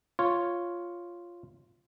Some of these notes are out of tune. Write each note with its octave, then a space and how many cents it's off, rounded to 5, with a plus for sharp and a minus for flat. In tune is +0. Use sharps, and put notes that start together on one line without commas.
F4 +0 C#5 +0